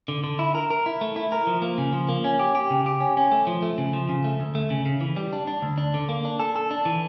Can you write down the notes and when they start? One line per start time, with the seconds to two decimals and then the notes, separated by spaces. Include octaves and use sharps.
0.08 D3
0.24 D3
0.39 E4
0.55 A#4
0.70 A#4
0.86 E4
1.01 A3
1.16 E4
1.32 A#4
1.47 F3
1.62 A#3
1.78 C#3
1.93 F3
2.09 A#3
2.24 C#4
2.39 G4
2.55 G4
2.70 C#3
2.86 G4
3.00 C#4
3.17 C#4
3.32 A3
3.47 F3
3.62 A3
3.78 C#3
3.93 F3
4.09 C#3
4.24 A3
4.40 D2
4.55 A3
4.70 C#3
4.86 C#3
5.01 E3
5.16 G3
5.33 D4
5.47 D4
5.62 D2
5.78 D4
5.94 D3
6.09 A#3
6.25 D4
6.40 A4
6.56 A4
6.71 D4
6.85 E3